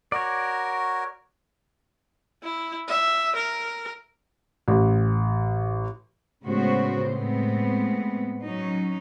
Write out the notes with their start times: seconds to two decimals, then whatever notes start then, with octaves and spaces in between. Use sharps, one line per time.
0.12 F#4 A#4 C#5 D5
2.43 E4
2.88 E5
3.36 A#4
4.68 A1
6.44 A2 C#3 G#3 B3 F#4 C5
7.11 A2 G#3 B3 C4
8.43 F#3 C#4 D#4